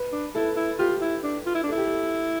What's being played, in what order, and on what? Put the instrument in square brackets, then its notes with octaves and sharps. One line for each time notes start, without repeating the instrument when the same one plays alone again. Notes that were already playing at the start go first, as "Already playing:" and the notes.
Already playing: [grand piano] B4
[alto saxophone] D4
[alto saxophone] E4 [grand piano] A4
[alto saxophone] E4
[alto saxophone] F4 [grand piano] G4
[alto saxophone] E4
D4
F4
E4
D4
[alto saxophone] E4 [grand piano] A4
[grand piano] G4
A4